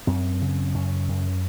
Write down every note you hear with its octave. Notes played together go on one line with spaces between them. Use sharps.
F#2 C4
C#3
F#2 C#4
F#2